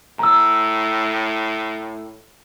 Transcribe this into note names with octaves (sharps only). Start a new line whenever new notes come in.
A2 A#5 E6